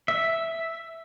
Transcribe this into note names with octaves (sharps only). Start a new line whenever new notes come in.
E5